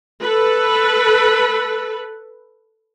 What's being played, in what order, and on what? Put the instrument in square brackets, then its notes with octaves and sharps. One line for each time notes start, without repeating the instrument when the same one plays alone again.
[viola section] A4 B4